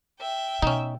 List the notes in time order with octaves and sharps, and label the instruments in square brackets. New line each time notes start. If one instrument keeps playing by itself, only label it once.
[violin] E5 G5
[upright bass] B2 [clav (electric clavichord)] C#4 D#4